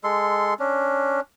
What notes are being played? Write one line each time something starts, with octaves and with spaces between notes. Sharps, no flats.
G#3 A4 C6
C#4 D4